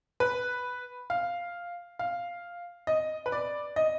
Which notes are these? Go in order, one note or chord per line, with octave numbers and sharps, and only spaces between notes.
B4
F5
F5
D#5
B4
D5
D#5